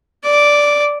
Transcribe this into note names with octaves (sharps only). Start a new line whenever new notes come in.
D5 D6